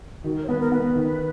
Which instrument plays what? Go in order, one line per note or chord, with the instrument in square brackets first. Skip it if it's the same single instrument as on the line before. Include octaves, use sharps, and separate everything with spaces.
[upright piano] D#3 [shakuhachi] F#4
[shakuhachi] A#4
C#5
[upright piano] B3 [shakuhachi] B4
[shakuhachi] A#4
[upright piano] B3 [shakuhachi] B4
[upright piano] D#3